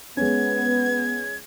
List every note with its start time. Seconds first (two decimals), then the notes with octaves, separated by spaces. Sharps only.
0.17 G#3 B3 C#4 G#6